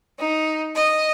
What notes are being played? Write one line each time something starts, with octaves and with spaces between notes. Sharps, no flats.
D#4
D#5